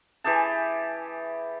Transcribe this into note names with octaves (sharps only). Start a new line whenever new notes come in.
E3 G4 G#4 A5